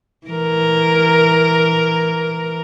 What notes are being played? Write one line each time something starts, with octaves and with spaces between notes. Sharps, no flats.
E3 A#4